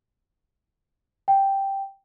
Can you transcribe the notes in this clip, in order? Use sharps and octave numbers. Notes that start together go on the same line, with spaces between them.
G5